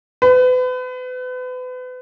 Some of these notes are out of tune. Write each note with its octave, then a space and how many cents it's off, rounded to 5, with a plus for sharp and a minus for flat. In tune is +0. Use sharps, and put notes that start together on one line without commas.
B4 +35